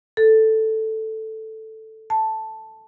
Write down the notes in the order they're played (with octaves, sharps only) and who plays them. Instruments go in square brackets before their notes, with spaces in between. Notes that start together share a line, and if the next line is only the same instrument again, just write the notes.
[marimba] A4
A5